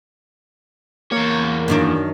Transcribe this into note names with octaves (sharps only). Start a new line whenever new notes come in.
E2 A#3 C#5
F#2 D#3 D4